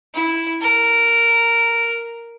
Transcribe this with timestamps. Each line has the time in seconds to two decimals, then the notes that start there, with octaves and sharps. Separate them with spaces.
0.15 E4
0.61 A#4